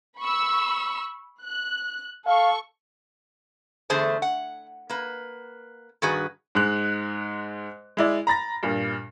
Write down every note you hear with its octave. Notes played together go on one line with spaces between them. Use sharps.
B5 C#6 E6
F#6
A4 F5 C#6
E2 D3 A3 G#4 C5 A5
F#5
A#3 B4
G2 D#3 F#4 G#4 B4
G#2 G#3 F#6
G#3 E4 D5
A#5 B5 A6 A#6
G2 A#2